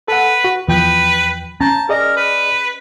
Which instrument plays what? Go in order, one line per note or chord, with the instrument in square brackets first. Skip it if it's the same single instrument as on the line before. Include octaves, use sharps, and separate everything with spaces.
[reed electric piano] A4 F#5 [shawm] B4
[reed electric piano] F#4
[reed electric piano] E2 G5 G6 [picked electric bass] F3 [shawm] B4
[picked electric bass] C#4 [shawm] A5 [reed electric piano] A#5 G6
[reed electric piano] G#4 D5 D#5 [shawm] A#4
[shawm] B4